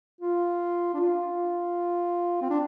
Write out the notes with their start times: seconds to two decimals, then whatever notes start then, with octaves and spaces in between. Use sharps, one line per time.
0.21 F4
0.94 D4
1.01 F4
2.42 C4
2.51 D4